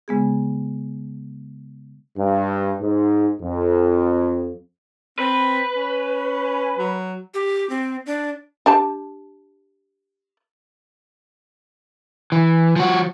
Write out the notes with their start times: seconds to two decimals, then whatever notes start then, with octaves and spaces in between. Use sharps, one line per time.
0.08 C#3 G#3 B3 G#4
2.17 G2
2.81 G#2
3.41 F2
5.19 C4 B4
5.75 C#4
6.78 F#3
7.34 G4
7.70 C4
8.06 D4
8.66 D4 G4 A5
12.32 E3
12.76 F3 F#4